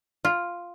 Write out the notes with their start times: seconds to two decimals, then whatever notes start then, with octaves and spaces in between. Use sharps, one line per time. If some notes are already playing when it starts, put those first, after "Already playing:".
0.25 F4